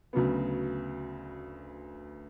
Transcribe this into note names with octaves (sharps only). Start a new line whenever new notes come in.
D2 C#3 F#3 B3